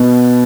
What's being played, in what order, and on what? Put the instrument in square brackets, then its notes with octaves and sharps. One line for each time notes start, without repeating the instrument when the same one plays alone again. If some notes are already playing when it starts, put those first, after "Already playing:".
Already playing: [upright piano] B2